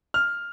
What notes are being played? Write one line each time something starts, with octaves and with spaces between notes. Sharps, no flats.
F6